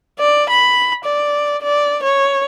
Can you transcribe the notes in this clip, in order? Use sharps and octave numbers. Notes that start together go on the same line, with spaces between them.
D5
B5
D5
D5
C#5